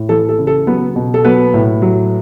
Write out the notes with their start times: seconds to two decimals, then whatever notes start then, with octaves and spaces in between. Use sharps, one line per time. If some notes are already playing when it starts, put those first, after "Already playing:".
Already playing: A2
0.09 E3 A4
0.29 A4
0.38 C#3
0.47 A4
0.67 F#3 B3 B4
0.96 B2
1.14 A4
1.25 F#3 B3 B4
1.54 A2
1.82 F#3